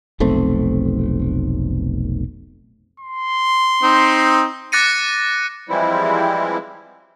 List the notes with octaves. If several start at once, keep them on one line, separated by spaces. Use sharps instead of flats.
F1 B1 A3 C4
C6
C4 D#4
D6 F#6 A6 A#6 C#7 D#7
E3 F3 G3 G#3 C4 E4